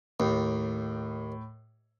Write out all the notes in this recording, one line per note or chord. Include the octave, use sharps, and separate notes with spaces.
D#2 A2